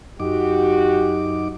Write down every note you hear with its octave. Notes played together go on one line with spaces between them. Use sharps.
F#2 D#4 F#4 G4 D6